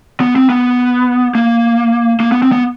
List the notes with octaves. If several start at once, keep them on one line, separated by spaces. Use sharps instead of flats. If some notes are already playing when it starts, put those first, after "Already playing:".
B3
C4
B3
A#3
A#3
B3
C4
B3